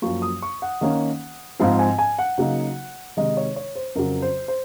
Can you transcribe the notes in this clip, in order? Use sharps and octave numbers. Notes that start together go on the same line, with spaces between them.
F#2 F3 A#3 C#6
D#6
C#6
F#5
D#3 A#3 C#4
G#2 F3 C4 F5
G#5
G#5
F#5
C#3 F#3 A#3 D#4
C3 D#3 G#3 D#4 D#5
C#5
C#5
C5
F2 C#3 F#3 C#4 A#4
C5
C5